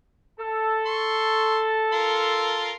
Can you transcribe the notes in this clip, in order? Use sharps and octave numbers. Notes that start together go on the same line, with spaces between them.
A4
C6 C#6
F4 A#4 C6